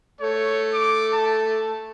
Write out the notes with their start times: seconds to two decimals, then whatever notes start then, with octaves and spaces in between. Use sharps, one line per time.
0.21 A3 C#5
0.74 D6
1.14 A5